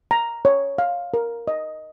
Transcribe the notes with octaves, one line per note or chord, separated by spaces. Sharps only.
A#5
C#5
F5
A#4
D#5